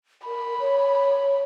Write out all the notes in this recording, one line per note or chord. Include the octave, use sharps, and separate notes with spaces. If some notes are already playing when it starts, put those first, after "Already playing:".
A#4 B5
C#5